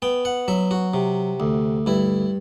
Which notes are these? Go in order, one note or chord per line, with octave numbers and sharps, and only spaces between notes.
B3 G5
F#5
F#3 E5
F#4
C3
D2
G2 E4